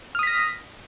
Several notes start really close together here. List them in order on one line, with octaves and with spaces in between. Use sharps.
F6 D#6 B6 A#6